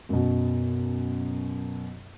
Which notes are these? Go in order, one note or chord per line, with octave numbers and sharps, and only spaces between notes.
F#2 B2